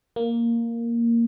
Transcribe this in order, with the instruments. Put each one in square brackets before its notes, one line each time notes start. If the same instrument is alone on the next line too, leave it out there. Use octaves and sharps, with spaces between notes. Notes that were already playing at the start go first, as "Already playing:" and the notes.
[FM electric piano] A#3